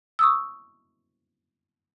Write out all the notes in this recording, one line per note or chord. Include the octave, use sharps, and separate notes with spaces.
C#6 D#6 E6